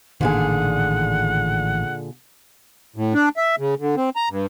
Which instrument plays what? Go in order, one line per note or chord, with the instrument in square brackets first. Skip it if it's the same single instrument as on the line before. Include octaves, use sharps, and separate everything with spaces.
[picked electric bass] A1 D#3 [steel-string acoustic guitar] A#2 D3 G#4 [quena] F#5
[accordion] A2
D4
E5
C#3
D3
C4
A#5
G2